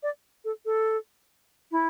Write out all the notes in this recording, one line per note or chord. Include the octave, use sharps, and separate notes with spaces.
D5
A4
A4
E4